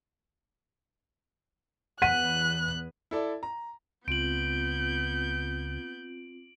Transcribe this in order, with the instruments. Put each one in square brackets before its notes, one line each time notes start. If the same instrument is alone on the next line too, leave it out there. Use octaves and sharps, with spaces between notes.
[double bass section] E2 B3 [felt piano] F#5 B6 D#7 [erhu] F#6
[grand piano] E4 A4 D5
A#5
[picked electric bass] C#2 [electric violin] B3 G6 [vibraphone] C4 F4 [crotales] D7 F#7